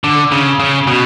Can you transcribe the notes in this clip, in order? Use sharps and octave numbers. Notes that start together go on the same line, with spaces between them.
D3
C#3
C#3
B2